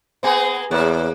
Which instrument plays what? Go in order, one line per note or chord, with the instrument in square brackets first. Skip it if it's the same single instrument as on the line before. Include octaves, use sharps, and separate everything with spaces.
[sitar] A#3 B3 G#4 [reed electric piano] C5 G#5
[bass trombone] E2 [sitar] A#3 [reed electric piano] G#4 C#5 F#6